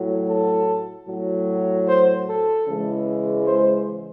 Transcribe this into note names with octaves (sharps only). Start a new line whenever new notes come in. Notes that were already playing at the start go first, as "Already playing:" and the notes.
Already playing: A2 F#3
A4
A2 F#3
C5
A4
C#3 E3 G#3
C5